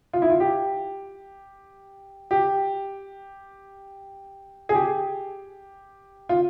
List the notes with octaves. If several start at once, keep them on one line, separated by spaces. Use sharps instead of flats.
F4
E4
F4
G4
G4
G#4
G4
F4